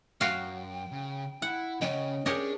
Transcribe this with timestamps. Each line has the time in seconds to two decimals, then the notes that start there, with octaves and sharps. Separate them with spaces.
0.21 F#2 F#4 F5 G5
0.92 C#3
1.42 E4 F#5
1.81 C#3 C#4 D#5 G5
2.26 C#4 D4 G4 G#4 A#4 C#5 D#5